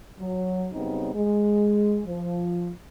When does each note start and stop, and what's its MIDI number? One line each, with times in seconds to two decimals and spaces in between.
0.20 0.67 54
0.73 1.11 42
0.73 1.11 49
0.73 1.11 55
0.73 1.11 59
0.73 1.11 60
0.73 1.11 63
1.15 1.99 56
2.05 2.70 53